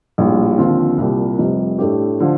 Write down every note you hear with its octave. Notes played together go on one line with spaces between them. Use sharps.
A#1 A2 G3
D#2 D3 F3 C4 F4
C2 A#2 G3 A#3
F1 F2 C3 G3
A2 A3 D4 G4
D3 F3